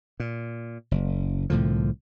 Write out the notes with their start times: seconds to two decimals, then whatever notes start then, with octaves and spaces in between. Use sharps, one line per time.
0.20 A#2
0.91 F#1
1.50 C2 A2 D3 F3